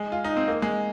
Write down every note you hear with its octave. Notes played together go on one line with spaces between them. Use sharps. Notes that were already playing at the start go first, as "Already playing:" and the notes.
Already playing: G#3
F4
D#4
C4
A#3
G#3